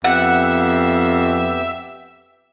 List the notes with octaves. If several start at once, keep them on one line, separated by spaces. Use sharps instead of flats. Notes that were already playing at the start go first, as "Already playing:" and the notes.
F2 B3 G4 E5 F#5